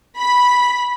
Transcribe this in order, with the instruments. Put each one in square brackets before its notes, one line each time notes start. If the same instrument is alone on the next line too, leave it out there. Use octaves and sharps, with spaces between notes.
[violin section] B5 B6